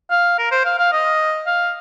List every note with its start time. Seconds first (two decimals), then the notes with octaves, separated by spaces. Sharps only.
0.11 F5
0.38 A#4
0.51 C5
0.65 F5
0.79 F5
0.92 D#5
1.46 F5